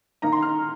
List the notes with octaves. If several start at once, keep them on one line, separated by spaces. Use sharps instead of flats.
D#3 A#3 D#4 A#5
C6
F6